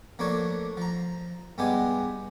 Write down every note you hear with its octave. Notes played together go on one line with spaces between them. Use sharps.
F3 A3 A#3 D4 C#5
F3 A#5
G2 G#3 B3 G4 G#5